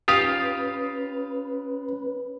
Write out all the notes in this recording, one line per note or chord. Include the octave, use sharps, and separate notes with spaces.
C#4 F4 G4 B4 F5 D#6